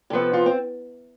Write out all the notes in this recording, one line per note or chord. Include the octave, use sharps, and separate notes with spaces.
C3 F3 B3 A4
F4
C4